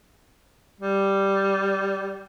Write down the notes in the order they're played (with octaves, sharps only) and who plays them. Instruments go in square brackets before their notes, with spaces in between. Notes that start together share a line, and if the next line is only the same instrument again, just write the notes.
[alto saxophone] G3